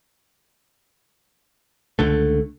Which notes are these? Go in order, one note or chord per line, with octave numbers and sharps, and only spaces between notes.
C#2 D3 A3